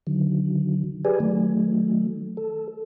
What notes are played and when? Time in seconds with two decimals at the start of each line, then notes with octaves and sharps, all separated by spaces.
0.07 D3 D#3 F#3
1.05 G4 G#4 B4 D5 G#5
1.20 D#3 F#3 A3
2.37 A4